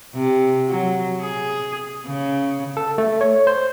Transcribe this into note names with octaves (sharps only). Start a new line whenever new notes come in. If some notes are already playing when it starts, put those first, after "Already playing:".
C3
F#3
G#4
C#3
A4
A3
C#5
C5